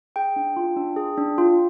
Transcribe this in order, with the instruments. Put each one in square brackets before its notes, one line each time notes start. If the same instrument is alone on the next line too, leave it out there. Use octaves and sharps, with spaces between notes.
[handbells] G#4 G5
D4
F4
D4
G#4
D4
F4